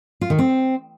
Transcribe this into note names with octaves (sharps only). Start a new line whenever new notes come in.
F4
D#3
C4